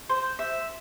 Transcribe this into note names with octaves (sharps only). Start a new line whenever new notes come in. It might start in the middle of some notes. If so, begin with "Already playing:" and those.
C5
E5